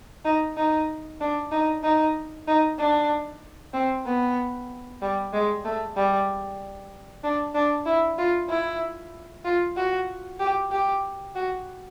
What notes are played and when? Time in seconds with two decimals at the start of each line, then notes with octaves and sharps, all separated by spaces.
0.25 D#4
0.57 D#4
1.21 D4
1.52 D#4
1.83 D#4
2.48 D#4
2.79 D4
3.73 C4
4.06 B3
5.02 G3
5.33 G#3
5.65 A3
5.97 G3
7.24 D4
7.55 D4
7.86 E4
8.18 F4
8.49 E4
9.45 F4
9.76 F#4
10.40 G4
10.71 G4
11.35 F#4